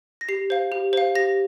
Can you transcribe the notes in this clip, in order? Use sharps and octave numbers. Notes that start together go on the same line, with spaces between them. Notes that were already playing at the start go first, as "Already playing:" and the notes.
A#6
G4 C7
C5 F5
G4
C5 F5
G4 A#6